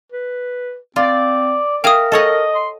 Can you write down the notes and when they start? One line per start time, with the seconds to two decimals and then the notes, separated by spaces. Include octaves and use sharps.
0.12 B4
0.96 C4 F4 D5
1.84 G#4 A#4 E5 F5 G5 D#6
2.12 A4 C#5 D#5 F#5
2.55 C6